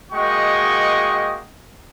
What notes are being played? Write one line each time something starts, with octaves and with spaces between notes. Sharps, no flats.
G#3 A#3 F#4 D#5 G5 C#6